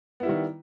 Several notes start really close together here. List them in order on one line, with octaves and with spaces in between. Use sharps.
B3 E4 G3 D#3